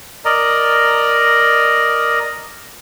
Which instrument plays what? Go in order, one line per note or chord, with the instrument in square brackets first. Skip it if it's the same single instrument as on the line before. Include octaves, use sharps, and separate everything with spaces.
[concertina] A#4 D5 D#5 A#5